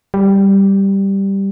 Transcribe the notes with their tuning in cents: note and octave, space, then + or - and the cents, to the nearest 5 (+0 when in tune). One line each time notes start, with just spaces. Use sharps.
G3 +0